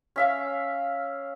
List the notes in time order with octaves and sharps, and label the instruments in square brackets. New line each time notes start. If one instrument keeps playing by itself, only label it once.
[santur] C#4 E5 F5